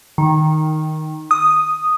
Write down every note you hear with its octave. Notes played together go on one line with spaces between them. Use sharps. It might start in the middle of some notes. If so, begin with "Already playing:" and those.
D#3
D#6